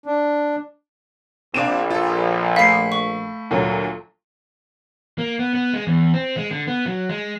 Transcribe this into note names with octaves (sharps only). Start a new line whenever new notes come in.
D4
A#1 C4 D4 F5 D6 D7 E7
F4 A4
A3 F5 B5 B6 C7
C#6
D2 A#2 F#3
A#3
B3
B3
G#3
E2
C4
G#3
D3
B3
F#3
G#3